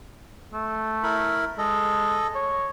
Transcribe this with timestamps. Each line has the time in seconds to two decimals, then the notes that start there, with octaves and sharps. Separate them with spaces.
0.54 A3
1.03 E4 A#4 B5
1.58 G#3 A4 D#5
2.35 C#5